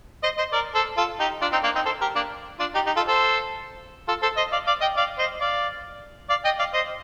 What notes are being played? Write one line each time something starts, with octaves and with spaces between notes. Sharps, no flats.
C5 D#5
C5 D#5
A#4 D5
A4 C5
F4 A4
D#4 G4
D4 F4
C4 D#4
A#3 D4
C4 D#4
A4 C5
G4 A#4
A#3 D4
D4 F4
D#4 G4
D#4 G4
F4 A4
A4 C5
F4 A4
A4 C5
C5 D#5
D5 F5
D5 F5
D#5 G5
D5 F5
C5 D#5
D5 F5
D5 F5
D#5 G5
D5 F5
C5 D#5